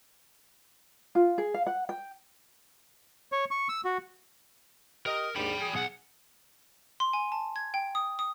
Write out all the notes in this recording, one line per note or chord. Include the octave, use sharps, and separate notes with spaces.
F4
G#4
F5
F#5
G5
C#5
C#6
E6
F#4
G4 A#4 D#5
D#2 G#2 D4 G5 B5
G#4
B1 F#5
C6
G#5
A5
G#6
G5
D#6
D#6